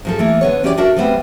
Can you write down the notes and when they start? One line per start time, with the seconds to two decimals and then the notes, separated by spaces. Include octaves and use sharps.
0.05 G#2 F3 A4
0.19 E3 A3 A#3
0.41 D3 B3 C#5
0.63 E3 C#4 G4 A#4 D5
0.77 D4 F#4 A4 A#4 E5
0.96 F3 G3 A3 B3 C4